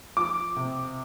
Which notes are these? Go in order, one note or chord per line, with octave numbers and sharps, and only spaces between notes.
F3 D6
C3